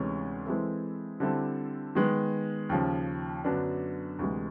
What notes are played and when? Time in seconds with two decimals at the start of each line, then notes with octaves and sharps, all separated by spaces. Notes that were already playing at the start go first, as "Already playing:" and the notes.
Already playing: D2 C3 E3 G#3 C#4
0.46 E3 G#3 C4 E4 A4
1.20 D3 G3 C4 E4 A4
1.95 D#3 G#3 B3
2.69 D#2 C#3 F3
3.44 F#2 D3 F#3 B3 D4
4.19 D2 C3 E3 G#3